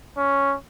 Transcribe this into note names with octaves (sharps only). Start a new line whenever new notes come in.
C#4